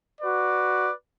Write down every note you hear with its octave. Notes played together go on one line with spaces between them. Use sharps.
F#4 B4 D5